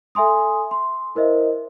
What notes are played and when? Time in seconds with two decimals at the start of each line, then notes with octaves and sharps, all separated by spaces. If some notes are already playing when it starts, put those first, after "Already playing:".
0.15 A4 E5 G#5 C6 D#6
0.71 C6
1.15 E4 A#4 C5 D#5 E5